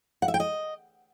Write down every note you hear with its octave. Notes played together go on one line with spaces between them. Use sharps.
F#5
E5
G5
D#5